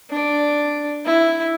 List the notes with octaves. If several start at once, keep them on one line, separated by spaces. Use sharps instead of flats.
D4 D5
E4